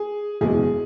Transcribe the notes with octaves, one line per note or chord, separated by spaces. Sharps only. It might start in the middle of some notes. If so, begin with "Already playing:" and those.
Already playing: G#4
F#1 E2 B2 G#3 G#4